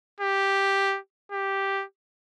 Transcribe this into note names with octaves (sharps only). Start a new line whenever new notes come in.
G4
G4